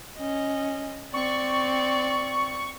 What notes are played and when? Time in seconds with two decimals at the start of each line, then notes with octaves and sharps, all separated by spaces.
0.18 C#4 D#5
1.14 C4 D5 C#6